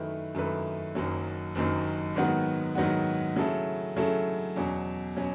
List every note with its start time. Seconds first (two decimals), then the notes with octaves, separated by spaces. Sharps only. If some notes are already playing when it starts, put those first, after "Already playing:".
Already playing: F#2 D#3 A3 E4 B4
0.35 F#2 D#3 A3 E4 B4
0.95 F#1 F#2 D#3 F#3
1.55 F#1 F#2 D#3 F#3
2.15 G#2 D#3 F#3 B3 F#4
2.75 G#2 D#3 F#3 B3 F#4
3.36 C#3 F#3 A3 E4 A4
3.96 C#3 F#3 A3 E4 A4
4.56 E2 B2 F#3 C#4
5.17 B2 F#3 C#4